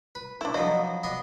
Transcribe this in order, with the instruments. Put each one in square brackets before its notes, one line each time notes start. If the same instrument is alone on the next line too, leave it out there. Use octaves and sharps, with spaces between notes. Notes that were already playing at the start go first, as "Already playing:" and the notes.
[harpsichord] B4
[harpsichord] A3 [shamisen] D4 E4
[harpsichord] F3 F#3 B3 [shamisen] D#5
[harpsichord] B3 D4 D#5